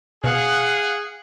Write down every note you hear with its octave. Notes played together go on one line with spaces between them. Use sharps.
B2 G#4 F5 F#5